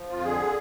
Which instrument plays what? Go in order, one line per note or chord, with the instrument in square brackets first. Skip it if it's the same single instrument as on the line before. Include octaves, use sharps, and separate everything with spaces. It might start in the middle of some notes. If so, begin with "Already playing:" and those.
Already playing: [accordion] F3
F2 F4
D3 G#4